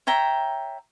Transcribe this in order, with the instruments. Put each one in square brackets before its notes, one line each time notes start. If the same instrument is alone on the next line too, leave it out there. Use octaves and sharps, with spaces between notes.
[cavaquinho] C#5 E5 G5 A#5